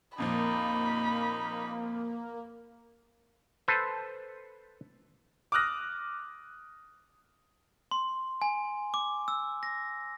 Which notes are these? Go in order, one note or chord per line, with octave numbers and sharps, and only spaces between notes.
F2 A#2 F3 A#3 D#4 B5
A4 B4 C5
D6 D#6 F6 F#6 A#6
C6
G#5
D6
E6
A#6